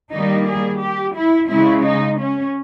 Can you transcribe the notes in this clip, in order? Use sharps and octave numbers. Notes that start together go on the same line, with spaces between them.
D#3 G3 A#3 D#4
G#4
G4
E4
C#3 G#3 E4
D#4
C#4